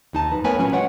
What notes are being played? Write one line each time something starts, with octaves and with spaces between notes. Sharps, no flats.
D#2 D#4 A5
F#2 B4
A3 B3 A#4 B4 C#5 G#5
A#2 F#3 C#4 F4 G#5
G#3 B4 C#5 F#5 G5